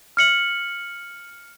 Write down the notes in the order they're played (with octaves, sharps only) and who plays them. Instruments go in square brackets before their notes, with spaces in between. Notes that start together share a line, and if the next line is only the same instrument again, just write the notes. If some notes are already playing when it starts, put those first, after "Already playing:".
[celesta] F6 C#7 F#7